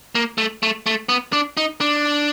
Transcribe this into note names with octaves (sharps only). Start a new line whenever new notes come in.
A#3
A3
A3
A3
B3
D4
D#4
D4